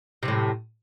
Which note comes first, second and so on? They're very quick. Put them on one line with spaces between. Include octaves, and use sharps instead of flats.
C3 F#2 A2